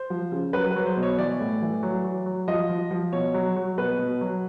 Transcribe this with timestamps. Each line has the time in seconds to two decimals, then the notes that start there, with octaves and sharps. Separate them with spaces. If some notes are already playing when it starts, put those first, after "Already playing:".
Already playing: C5
0.10 F3
0.32 C#3
0.53 F#3 B4
0.71 B4
0.76 F#3
0.86 C5
0.97 B2
1.03 C#5
1.18 E3 D5
1.40 A2
1.62 E3
1.83 F#3
2.04 F#3
2.26 F#3
2.48 F3 D#5
2.69 F3
2.91 F3
3.13 B2 C#5
3.34 F#3
3.56 F#3
3.78 B2 B4
3.99 B2
4.21 F#3